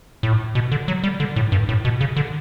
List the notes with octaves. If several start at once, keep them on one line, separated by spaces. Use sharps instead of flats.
A2
B2
D3
F#3
G3
D3
A2
G2
A2
B2
C#3
D3